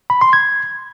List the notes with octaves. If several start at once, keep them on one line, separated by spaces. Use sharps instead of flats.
B5
C6
G#6